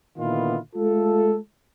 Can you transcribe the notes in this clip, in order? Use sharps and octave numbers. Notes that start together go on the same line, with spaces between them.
A#2 D3 D#3 B3 E4 F4
G#3 A3 F4 A4